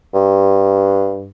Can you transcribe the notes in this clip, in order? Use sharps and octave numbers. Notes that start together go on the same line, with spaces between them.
G2